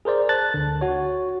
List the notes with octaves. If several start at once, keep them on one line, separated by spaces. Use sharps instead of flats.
G#4 A#4 C5 D5
A5 F#6 A6
D2 D3
F#4 C#5